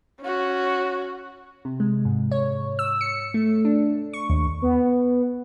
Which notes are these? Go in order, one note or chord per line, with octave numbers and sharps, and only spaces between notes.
C#4 F#4
C3
G#3
G#2
C#5
E6
C#7
A3
D4
C#6
D#2
B3